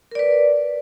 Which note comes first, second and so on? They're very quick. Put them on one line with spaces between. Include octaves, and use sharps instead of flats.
A#4 D5 B4